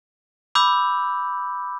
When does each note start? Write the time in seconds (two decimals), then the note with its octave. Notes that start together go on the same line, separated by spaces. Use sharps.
0.55 B5 D6 E6 G6